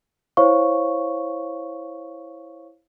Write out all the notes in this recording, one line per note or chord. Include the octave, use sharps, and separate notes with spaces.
E4 C5 C#5 F5 C#6